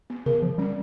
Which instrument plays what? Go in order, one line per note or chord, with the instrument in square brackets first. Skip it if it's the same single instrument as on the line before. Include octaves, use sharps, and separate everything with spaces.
[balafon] B3
[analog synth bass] C#3 [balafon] A#4
[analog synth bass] F3 [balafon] B3
[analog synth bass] G3 [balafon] C#4